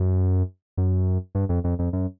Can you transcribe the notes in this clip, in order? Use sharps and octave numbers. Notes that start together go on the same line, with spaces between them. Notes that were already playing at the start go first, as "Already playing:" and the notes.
Already playing: F#2
F#2
G2
F2
F2
F2
F#2